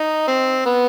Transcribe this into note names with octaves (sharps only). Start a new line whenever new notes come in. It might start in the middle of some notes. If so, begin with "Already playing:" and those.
Already playing: D#4
C4
B3